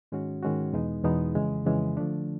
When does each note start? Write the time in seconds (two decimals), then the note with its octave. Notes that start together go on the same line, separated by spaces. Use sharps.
0.12 G#2 D#3 G#3 C#4 F#4
0.42 G#2 D#3 G#3 C#4 F#4
0.73 E2 B2 G#3 B3 D#4
1.04 E2 B2 G#3 B3 D#4
1.35 F2 C#3 E3 G#3
1.65 F2 C#3 E3 G#3
1.97 D3 F3 A3 D4